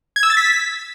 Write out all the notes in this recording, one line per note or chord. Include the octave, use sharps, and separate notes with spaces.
G#6
E6
A6
B6